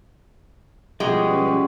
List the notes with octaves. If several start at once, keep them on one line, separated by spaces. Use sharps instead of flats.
B2 F3 G3 G#3 C#4 F#4 G4 B4